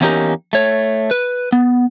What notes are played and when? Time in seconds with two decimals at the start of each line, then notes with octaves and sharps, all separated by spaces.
0.01 E2 A#3 C#4 D#4 G4 A#4
0.53 A3 C#5
1.11 B4
1.52 B3